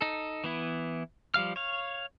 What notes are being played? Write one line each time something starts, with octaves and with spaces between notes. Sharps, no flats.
D#4 A4
E3 B3 E4
F3 G3 F5 F6
C#5 F5